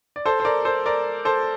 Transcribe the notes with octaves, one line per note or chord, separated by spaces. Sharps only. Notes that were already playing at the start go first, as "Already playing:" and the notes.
D5
A4 C5
C5
A#4 D5
A4 C5
A#4 D5
A4 C5